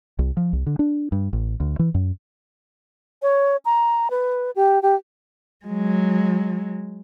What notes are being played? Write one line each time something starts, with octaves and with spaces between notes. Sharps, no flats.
C2
F3
C2
D3
D4
G2
A1
D2
E3
F#2
C#5
A#5
B4
G4
G4
F#3 G#3